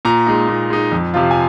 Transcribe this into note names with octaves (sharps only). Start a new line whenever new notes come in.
A#2 A#5
G#3 D#4
A#2
G#3 D#4
F2
C3 F3 C4 F4
G#5